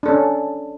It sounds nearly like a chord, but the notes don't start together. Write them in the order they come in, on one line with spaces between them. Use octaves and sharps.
D4 A4 C#4